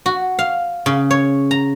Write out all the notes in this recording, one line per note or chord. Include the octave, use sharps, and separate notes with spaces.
F#4
F5
C#3
C#5
A#5